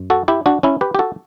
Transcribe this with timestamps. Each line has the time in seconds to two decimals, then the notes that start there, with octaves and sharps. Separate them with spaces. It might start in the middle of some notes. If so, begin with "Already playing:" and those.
Already playing: F#2
0.10 F#4 A4
0.28 E4 G4
0.46 D4 F#4
0.63 C#4 E4
0.81 G4 B4
0.95 G4
0.99 F#4 A4